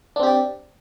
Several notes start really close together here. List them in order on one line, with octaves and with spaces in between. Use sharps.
D4 C4 G4 D5